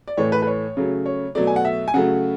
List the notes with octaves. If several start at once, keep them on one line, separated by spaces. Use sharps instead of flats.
D5
A2 E3 A3 C#5
B4
B4
C#5
C#3 F#3 A3
C#5
B2 F#3 A3 D5
G#5
F#5
E5
G#5
C#3 F#3 A3 F#5